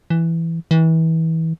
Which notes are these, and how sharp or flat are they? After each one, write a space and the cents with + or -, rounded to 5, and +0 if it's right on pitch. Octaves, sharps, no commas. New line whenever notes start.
E3 +5
E3 -30